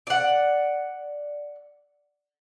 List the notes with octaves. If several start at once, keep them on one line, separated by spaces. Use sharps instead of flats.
D5 F#5